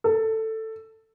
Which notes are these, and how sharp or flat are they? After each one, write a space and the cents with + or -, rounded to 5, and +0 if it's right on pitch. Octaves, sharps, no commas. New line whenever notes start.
A4 +10